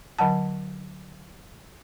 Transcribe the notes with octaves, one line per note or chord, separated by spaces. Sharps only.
D3 F#3 F#5 A5